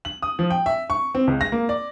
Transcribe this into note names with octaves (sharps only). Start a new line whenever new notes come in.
F#7
D#6
F3
G5
E5
C#6
C4
C#2
A#6
A#3
D5